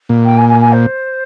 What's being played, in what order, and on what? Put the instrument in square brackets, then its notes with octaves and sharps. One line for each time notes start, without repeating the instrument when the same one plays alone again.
[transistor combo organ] A#2
[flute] G5
G#5
G#5
G#5
C5